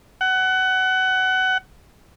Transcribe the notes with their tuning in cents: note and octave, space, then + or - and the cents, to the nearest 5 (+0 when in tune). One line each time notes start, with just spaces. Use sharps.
F#5 +25